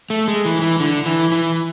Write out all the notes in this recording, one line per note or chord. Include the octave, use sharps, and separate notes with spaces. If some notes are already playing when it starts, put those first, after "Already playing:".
A3
G#3
E3
E3
D3
E3
E3